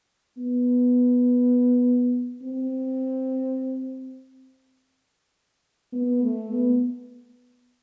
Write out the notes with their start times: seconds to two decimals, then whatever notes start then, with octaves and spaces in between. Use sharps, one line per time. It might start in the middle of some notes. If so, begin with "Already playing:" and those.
0.37 B3
2.42 C4
5.93 B3
6.22 A3
6.50 B3